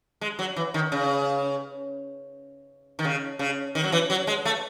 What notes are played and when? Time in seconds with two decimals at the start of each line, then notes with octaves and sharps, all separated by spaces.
0.21 G#3
0.39 F#3
0.56 E3
0.74 D#3
0.92 C#3
2.99 D#3
3.05 C#3
3.39 C#3
3.75 D#3
3.83 F#3
3.92 E3
4.10 F#3
4.27 G#3
4.45 A3